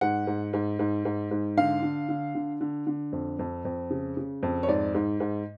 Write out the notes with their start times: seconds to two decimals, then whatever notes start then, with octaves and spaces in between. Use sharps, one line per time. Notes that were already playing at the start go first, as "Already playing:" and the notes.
0.01 G#2 F#5
0.27 G#2
0.53 G#2
0.79 G#2
1.05 G#2
1.31 G#2
1.57 D3 F5
1.83 D3
2.09 D3
2.35 D3
2.61 D3
2.87 D3
3.12 F2
3.39 F2
3.65 F2
3.90 C#3
4.17 C#3
4.43 F2
4.63 C#5
4.68 G#2 D5
4.95 G#2
5.20 G#2